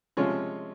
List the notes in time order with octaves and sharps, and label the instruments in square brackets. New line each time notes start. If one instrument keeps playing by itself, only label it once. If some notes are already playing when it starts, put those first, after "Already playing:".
[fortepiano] C3 F3 G#3 C#4 F4